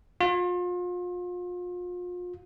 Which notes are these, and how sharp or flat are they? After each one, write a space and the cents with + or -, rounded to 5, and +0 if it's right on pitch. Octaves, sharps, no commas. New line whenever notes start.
F4 +35